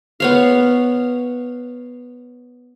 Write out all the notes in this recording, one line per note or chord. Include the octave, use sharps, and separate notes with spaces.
B3 C#5 F5